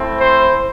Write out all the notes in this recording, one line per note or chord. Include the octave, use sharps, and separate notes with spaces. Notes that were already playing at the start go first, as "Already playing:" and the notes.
Already playing: A3 C4 E4
C5